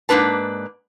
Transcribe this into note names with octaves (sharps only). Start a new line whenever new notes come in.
G#2 A#3 D4 B4 A5